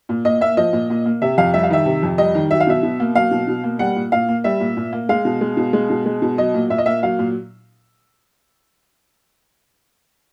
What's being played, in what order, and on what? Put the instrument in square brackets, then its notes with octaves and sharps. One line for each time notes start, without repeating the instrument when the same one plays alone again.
[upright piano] A#2
A#2 D#5
A#3 E5
F3 D#5
A#2
A#2
A#3
C3 E5
F2 F5
G3 E5
F5
D#3 E5
C3
F2
G3 D#5
D#3
F#3 E5
F5
B2 E5
B2
A#3
F#3 F5
B2
B2
A#3
G3 F#5
A#2
A#2 F5
A#3
G3 E5
A#2
A#2
A#3
G#3 F5
B2
G#3
B2
G#3
B2
G#3
B2
F#3 D#5
A#2
A#2 E5
D#5
A#3 E5
F#3 F5
A#2